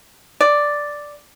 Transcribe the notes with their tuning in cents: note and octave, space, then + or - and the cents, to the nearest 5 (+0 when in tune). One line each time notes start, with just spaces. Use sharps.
D5 +0